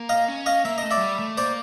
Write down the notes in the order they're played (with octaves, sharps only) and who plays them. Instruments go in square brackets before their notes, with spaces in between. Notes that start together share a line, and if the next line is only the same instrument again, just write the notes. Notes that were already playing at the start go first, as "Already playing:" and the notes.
Already playing: [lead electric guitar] A#3
[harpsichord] D#5 F5
[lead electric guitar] C#4
[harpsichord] D#5 F5
[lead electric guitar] A#3 [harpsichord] E5
[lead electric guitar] A3 [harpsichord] D#5
[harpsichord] D5 E5
[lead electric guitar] F#3
G3
A3
[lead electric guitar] A#3 [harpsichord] C5 D5